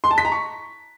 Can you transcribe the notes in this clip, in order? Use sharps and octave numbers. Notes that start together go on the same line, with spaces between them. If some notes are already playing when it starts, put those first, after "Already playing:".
C6
A5
B6
A#5
C#6